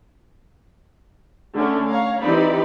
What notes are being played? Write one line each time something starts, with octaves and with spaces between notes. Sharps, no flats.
D3 A3 C#4
C#5 F5 A#5
E3 C4 D#4 G4 D5 B5